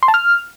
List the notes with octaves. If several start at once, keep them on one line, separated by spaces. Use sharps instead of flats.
C6
A5
F6